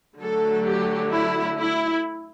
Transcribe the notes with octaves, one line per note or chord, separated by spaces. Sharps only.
D3 F#3 A3 A4
G4
E4
E4